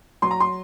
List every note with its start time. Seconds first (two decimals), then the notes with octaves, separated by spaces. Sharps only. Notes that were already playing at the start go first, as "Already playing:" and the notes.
0.22 F#3 C6
0.31 A#5
0.40 C6